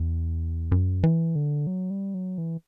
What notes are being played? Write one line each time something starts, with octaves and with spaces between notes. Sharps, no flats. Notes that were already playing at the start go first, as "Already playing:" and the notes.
Already playing: E2
F#2
E3
D3
F#3
G3
F#3
E3